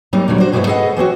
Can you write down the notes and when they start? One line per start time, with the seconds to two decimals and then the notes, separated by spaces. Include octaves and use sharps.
0.13 F#3 G3 A#3 C4 D#4
0.28 D2 A#2 D3 F#3 G3 F#4
0.40 D4 F#4 C5
0.52 G2 B2 G#3 B3 E4 C5
0.67 G#4 A4 B4 D#5 F5 F#5
0.97 E3 C4 C#4 F#4